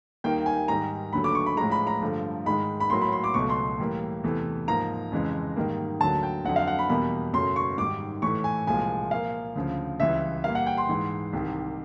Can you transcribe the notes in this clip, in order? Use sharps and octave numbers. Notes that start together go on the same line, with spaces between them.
D#2 D#3 G3 A#3 G5
G#5
G#2 D#3 G3 A#5
D#2 D3 F#3 A3 B5
D6
C#6
B5
A2 F3 G#3 A#5
B5
A#5
G2 D3 F3 A3
G#2 D#3 G#3 B5
B5
A2 F#3 A#3 C6
B5
C6
D6
C#2 B2 F#3 A3 C#6
C6
A2 E3 G3 A#3
E2 C3 E3 A3
G#2 F3 A#3 A#5
F2 C#3 E3 G#3
G#2 D#3 G3 A#3
D2 D3 F#3 A#3 A5
G5
F2 D3 F#3 F#5
F5
F#5
B5
E2 B2 G3 A#3 B5
F#2 C#3 F#3 A3 C6
C#6
G#2 D#3 G3 D6
A2 E3 A3 C#6
G#5
C2 A#2 F3 G#3 G#5
A#2 F3 A#3 F5
D2 C#3 F3
C#2 C#3 E3 G3 E5
A#2 G3 A#3 F5
F#5
G5
C6
G#2 E3 G#3
C2 C3 D#3